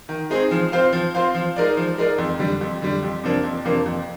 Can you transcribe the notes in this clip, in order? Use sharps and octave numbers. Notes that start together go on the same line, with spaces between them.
D#3
G#3 C4 D#4 G#4
F3
C4 F4 C5 F5
F3
C4 F4 C5 F5
F3
G#3 D#4 A#4 D5
F3
G#3 D#4 A#4 D5
F2
D3 G3
F2
D3 G3
F2
C3 F3 A#3 D4
F2
C3 F3 A#3 D4
F2